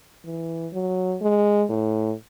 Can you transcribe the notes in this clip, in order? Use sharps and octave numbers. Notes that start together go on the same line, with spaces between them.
E3
F#3
G#3
A2